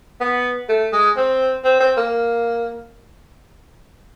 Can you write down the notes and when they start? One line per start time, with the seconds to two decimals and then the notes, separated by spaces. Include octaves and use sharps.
0.21 B3
0.69 A3
0.93 G#3
1.17 C4
1.65 C4
1.80 C4
1.97 A#3